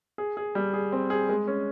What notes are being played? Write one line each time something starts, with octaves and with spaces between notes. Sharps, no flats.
G#4
G#4
G3
G#4
C4
G#4
G#3
C#4